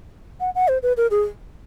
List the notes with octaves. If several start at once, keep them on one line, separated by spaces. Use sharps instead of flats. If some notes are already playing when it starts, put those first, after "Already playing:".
F#5
F#5
C5
B4
A#4
G#4